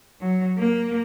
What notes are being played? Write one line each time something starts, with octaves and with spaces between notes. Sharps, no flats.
F#3
A#3